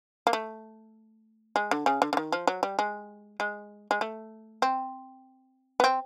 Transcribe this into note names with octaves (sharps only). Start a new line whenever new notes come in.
A#3
A3
G#3
D3
C#3
D3
D3
D#3
F3
F#3
G3
G#3
G#3
G#3
A3
C4
B3
C4